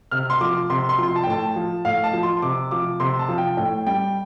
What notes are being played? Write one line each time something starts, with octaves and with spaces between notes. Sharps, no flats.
C3 F6
C6
F3 D6
C3 C6
C6
F3
C6
A5
G5
A2 A5
F3
A2 F5
A5
F3
C6
C3 D6
F3 D6
C3 C6
A5
F3
G5
A2 G5
G3 G5